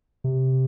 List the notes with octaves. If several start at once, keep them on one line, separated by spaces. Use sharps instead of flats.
C3